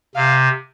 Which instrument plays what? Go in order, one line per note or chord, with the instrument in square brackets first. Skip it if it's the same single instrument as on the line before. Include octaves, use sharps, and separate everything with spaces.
[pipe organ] C3 [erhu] F5